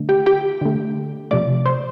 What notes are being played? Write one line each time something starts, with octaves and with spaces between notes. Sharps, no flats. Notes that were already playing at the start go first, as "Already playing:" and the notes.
Already playing: D3 A3
G4 G5
G4 G5
D3 A3
C3 F3 A3 D5 D6
C5 C6